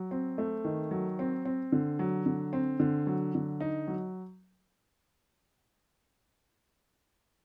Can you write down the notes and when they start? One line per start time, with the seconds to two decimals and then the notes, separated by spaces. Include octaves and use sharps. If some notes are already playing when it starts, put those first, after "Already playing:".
Already playing: F#3
0.11 C4
0.38 A3
0.65 D#3
0.91 F#3
1.19 C4
1.45 C4
1.72 D3
1.99 F#3
2.26 D3
2.53 C4
2.80 D3
3.07 F#3
3.35 D3
3.60 D#4
3.87 F#3